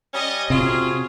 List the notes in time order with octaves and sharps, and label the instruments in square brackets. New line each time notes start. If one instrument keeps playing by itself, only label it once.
[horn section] G3 C#4 D#5
[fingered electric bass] C3 [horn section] F#3 F4 G#4